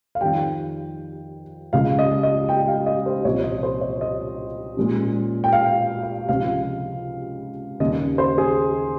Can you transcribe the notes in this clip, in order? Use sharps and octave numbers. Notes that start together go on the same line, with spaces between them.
F5
F2 D#3 G3 G5
C#2 C#3 G#3 F5
D#5
D#5
G5
F5
D#5
C5
C2 A#2 F3 C4 C#5
D#5
C5
C#5
D#5
A#2 G#3 C#4
G5
F5
F5
C#2 C3 F3 C4 F5
D#2 C#3 G3 C#4 D#5
C5
G#4